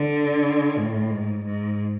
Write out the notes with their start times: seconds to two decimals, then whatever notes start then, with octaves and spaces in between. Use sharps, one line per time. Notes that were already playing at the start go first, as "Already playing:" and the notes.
Already playing: D3
0.78 A2
1.10 G#2
1.44 G#2